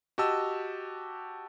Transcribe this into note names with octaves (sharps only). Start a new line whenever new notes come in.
F#4 G4 D#5 A5 E6